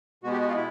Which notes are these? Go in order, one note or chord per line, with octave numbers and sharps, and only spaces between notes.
B2 G#3 B3 F#4
G4
F#4
F4
E4